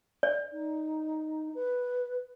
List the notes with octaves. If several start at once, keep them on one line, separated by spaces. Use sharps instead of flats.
D5
D#4
B4